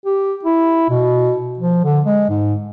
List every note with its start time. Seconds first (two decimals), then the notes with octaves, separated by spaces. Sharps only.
0.05 G4
0.44 E4
0.90 B2
1.59 F3
1.84 D3
2.06 G#3
2.29 G#2